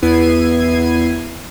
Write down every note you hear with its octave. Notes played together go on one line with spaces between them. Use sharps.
E2 B3 E4 G#6 C7 D#7